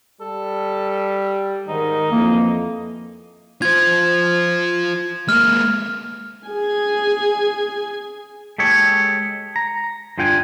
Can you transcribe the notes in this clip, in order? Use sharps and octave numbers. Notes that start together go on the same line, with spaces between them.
G3 A4
G#2 D#3 D#4
F2 E3 A#3
F4 C5 G#6
G#3 A#3 F6
G#4 G#5
G#3 G4 A4 C#5
A#5
G2 D3 F4 G5 G#5